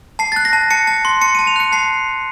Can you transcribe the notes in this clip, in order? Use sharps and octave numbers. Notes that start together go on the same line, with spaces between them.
A5 C7
F#6 A6
A#6
A5
A5 C#7
A5
C6
A5 C#7
A5 D#7
F7
F#6 C#7
A5 C7